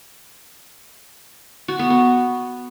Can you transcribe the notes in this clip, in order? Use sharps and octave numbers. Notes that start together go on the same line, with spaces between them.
F#4
B3
B3